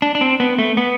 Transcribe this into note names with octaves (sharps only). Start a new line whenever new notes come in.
D4
D4
C4
B3
A3
B3